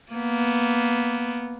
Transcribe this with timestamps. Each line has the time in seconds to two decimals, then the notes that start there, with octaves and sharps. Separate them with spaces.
0.13 A#3 B3